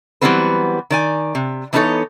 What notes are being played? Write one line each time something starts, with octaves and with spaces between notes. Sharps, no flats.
E3 F#3 G3 B3 C4 B4
D#3 D5 G#5
C3
E3 B3 D4 D#4 A4 C#5